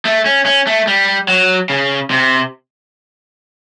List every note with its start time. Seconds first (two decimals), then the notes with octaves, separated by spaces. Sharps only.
0.05 A3
0.26 C#4
0.46 C#4
0.67 A3
0.87 G3
1.28 F#3
1.70 C#3
2.11 C3